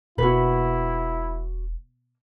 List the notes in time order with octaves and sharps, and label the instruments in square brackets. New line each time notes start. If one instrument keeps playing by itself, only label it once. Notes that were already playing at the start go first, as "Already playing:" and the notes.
[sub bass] E1 [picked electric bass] B2 A#3 [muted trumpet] E4 [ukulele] F#4 B4